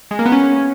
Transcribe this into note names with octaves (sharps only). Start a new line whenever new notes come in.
G#3
A#3
B3
C#4